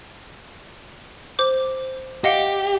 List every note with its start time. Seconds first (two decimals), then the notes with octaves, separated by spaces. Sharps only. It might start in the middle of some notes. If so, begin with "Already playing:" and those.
1.39 C5 D6
2.24 G4 D#5 F5 F#5